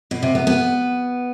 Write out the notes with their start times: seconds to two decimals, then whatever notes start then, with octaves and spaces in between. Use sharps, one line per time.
0.11 B2
0.23 C3
0.35 B3
0.47 B3